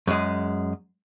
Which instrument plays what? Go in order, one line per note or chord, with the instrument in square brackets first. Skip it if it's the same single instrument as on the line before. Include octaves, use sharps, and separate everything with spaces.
[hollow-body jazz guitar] F#2 G#3